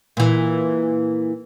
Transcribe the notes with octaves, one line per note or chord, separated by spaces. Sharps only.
A#2 E3